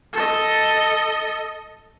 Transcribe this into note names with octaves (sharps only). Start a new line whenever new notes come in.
A4 D#5